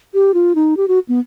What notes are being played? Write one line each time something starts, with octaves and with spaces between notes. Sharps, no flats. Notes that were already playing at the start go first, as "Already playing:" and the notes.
G4
F4
D#4
G4
F#4
B3